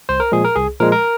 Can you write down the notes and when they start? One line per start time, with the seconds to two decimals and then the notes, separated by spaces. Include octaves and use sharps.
0.09 C2 C5
0.20 A#4
0.32 A#2 F3 G#3 G#4
0.45 A#4
0.56 C2 G#4
0.80 A#2 F3 G#3 A#4
0.92 A#4